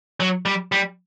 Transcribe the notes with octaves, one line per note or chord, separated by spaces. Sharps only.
F#3
G3
G3